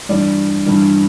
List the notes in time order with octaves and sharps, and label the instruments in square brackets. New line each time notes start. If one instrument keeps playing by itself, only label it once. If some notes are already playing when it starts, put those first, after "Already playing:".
[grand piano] G2 E3 G3 D5
G2 E3 G3